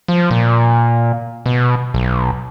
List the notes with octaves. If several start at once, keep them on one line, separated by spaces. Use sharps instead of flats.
F3
A#2
B2
B1